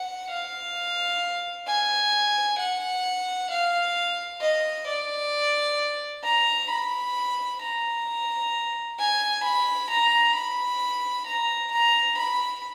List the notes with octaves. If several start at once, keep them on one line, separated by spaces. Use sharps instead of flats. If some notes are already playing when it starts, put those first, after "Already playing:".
Already playing: F#5
F5
G#5
F#5
F5
D#5
D5
A#5
B5
A#5
G#5
B5
A#5
B5
A#5
A#5
B5